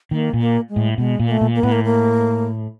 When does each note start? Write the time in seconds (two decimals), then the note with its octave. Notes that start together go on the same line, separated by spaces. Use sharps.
0.11 D#3 A#3
0.33 A#2
0.40 A#3
0.69 G#3
0.76 A2
0.98 B2 G#3
1.19 A#2
1.26 A#3
1.31 A3
1.41 A#2
1.55 A#3
1.63 A2 B3
1.72 A#3
1.84 A#3